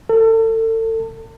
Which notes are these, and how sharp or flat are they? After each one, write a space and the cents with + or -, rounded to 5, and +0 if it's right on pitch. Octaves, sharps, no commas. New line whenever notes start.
A4 +35